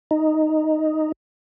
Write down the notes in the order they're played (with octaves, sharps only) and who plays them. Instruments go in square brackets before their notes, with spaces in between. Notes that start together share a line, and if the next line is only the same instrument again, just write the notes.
[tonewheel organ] D#4